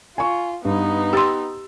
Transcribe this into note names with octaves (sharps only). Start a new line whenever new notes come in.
F4 G#5 C#6
G2 B3 D#4
G4 G5 C6 E6 A6